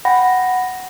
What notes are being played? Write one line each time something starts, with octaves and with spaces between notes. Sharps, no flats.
F#5 G5 B5 A#6